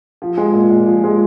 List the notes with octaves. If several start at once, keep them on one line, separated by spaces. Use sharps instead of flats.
F3
G#3
A#2
A#2
F3
G#3